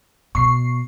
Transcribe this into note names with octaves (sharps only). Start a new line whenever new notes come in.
B2 C#6 C7